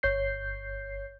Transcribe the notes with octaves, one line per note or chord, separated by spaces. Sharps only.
G1 C#5 G6 C7